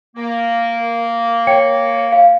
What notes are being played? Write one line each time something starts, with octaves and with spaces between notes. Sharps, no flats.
A#3
C#5 G5
F5